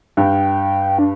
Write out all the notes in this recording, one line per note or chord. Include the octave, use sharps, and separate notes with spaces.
G2 G5
D4